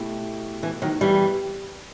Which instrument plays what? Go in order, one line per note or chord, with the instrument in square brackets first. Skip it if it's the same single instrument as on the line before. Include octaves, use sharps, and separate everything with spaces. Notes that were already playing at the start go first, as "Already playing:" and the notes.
Already playing: [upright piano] B2 A3 E4 G4
[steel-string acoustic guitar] E3
D#3 F#3
E3 G3